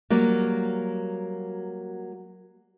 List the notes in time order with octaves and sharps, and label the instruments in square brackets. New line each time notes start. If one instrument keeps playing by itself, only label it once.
[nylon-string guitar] F#3 G3 A#3